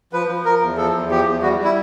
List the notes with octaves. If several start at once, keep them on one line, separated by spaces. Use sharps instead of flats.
F3 B4
F3
F3 A#4
E2
F3 A4
E2
F3 G4
E2
G3 F#4
G3
E4